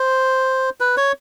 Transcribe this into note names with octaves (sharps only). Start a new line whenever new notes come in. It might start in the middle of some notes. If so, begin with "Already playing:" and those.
Already playing: C5
B4
C#5